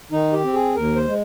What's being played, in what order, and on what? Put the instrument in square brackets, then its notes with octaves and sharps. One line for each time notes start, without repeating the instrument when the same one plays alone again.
[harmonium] D#3 D#4
G4
C4
G#4
D#2 A#4
C5
G#3